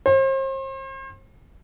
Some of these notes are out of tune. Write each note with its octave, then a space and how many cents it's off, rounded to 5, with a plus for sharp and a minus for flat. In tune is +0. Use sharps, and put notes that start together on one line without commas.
C5 +40